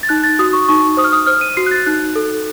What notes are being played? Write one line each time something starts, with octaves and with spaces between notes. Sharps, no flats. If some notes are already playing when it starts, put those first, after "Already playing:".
A6
D#4 F#6
A6
F#4 D#6
C#6
D#4 C#6
C5 D#6
F6
D#6
C5 F6
D#7
F#4 C7
F#6
A6
D#4 F#6
A4